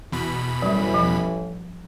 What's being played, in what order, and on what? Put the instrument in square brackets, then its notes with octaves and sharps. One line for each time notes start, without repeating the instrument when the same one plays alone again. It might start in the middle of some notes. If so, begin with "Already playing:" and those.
[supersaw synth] E2 B2 B5
[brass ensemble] A1 E3 [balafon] F#3 G3
[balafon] F3